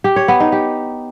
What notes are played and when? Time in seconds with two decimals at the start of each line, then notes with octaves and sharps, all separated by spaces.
0.04 G4
0.16 C#5
0.28 B3
0.40 D#4
0.52 G4